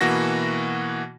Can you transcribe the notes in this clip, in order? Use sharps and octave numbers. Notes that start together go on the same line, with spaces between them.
B2 E3 A#3 F#4 A#6